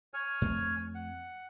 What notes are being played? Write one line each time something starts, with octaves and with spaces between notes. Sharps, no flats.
C#5 G#5 F6
F2 A3 C4
F#5